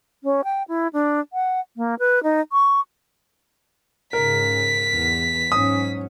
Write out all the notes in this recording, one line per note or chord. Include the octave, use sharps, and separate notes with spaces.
C#4
G5
E4
D4
F#5
A#3
B4
D#4
C#6
G#2 C#3 A#4 B6
E2
G#2 F#3 C#4 D#6